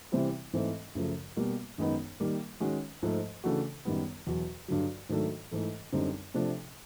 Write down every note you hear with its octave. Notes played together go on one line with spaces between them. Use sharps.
C3 E3 G3 C4 E4
G#2 E3 A3 C4
F#2 C#3 F3 A3
B2 G3 A#3
F#2 D#3 G#3 B3 D#4
D#3 G3 A#3
D#3 G#3 C#4 F#4
G#2 F3 A3
C#3 E3 A3 D4 F#4
F#2 D#3 G3 B3
E2 B2 F#3
G2 D3 F#3
G#2 D#3 F#3 A3 D4
G#2 E3 A3
F#2 D3 G3 C4 D#4
C3 F3 A3 D4